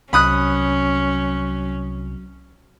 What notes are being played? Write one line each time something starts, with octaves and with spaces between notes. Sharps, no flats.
C2 F#3 C#4 B5 D#6 F#6